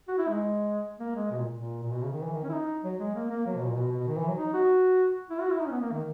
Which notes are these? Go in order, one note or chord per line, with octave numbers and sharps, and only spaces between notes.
F#4
E4
G#3
A#3
G#3
B2
A#2
A#2
A#2
B2
C#3
D#3
E3
D#3
C#4
E4
D#4
F#3
G#3
A#3
A#3
F#3
B2
A#2
B2
B2
D#3
E3
F#3
D#4
F#4
E4
F#4
E4
D#4
C#4
B3
A#3
D#3